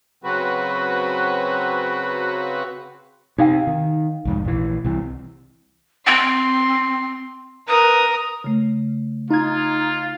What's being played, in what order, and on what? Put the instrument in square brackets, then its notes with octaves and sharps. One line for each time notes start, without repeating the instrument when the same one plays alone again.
[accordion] C#3 F#3 C4 F#4 B4
[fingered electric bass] C3 [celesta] D#4 F5 G5
[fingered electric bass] D#3
C2 F2 G#2
A#1 E3
C2 C3 E3
[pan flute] C4 [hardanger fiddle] C6
[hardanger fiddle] A#4 D#6 [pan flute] B4
[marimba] C#3 A3
[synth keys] D#4 G#6 [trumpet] F4